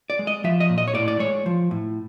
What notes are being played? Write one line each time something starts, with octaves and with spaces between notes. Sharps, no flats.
D5
G#3
D#5
F3 E5
D#5
A#2
D#5
C#5
A2 D5
D5
G#3 C#5
F3
A2